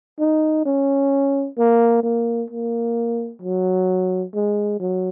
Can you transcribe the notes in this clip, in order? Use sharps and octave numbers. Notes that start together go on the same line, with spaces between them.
D#4
C#4
A#3
A#3
A#3
F#3
G#3
F#3